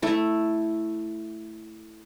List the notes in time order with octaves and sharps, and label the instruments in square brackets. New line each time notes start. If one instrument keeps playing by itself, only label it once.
[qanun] A3 E4